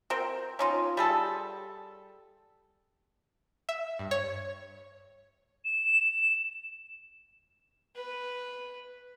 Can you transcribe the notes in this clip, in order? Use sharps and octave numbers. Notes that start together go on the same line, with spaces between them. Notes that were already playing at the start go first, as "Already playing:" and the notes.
C4 A#4 G5
C#4 D#4 F4
G3 G#4 A4
E5
G2
C#5
E7
B4